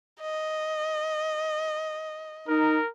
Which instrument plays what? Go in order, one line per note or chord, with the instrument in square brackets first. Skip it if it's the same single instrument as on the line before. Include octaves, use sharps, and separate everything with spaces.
[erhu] D#5
[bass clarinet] D#4 [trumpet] A#4